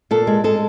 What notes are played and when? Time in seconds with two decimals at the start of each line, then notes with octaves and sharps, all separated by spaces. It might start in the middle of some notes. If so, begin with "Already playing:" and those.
0.11 A#2 A4
0.27 G#3
0.44 G#3 A4